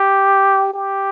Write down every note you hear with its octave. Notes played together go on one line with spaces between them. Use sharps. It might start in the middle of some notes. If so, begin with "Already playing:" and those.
Already playing: G4
G4